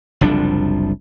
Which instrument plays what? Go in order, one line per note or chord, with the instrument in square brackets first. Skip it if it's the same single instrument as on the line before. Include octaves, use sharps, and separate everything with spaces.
[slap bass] F#1 C2 F3 D4